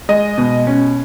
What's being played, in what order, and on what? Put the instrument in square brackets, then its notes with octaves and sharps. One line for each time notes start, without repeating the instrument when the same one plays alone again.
[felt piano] G#3 D#5
B2
C#4